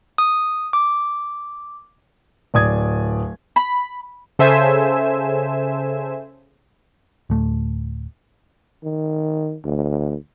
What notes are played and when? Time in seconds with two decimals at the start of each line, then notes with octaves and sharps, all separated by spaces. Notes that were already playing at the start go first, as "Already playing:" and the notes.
0.18 D#6
0.73 D6
2.54 D1 D5 D#6 G#6
3.56 B5
4.39 C#3 A4 C5 E5 G#5 E7
7.30 D1 A3
8.84 D#3
9.64 D2